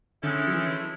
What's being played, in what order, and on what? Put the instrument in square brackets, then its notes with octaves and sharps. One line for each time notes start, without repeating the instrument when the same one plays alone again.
[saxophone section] A2 G#3 C#4 E4 A4 [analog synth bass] D3
[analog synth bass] F#3
E3